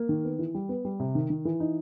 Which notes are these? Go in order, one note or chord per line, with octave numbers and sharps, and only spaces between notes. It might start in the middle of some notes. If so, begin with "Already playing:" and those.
Already playing: A#3
D#3
B3
E3
G3
B3
G3
C3
D#3
D#3
E3
D#4